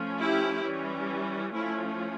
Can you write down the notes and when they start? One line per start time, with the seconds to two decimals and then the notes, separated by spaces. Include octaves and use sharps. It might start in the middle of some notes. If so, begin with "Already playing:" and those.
Already playing: F3 A3 C#4
0.20 E4 G4
0.65 E3 G3 C#4
1.54 F3 A3 C#4 E4